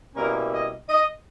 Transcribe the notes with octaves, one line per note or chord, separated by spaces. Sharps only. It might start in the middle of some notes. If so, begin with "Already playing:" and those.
B2 G3 A#3 C#4 E4 A#4
D#5
D#5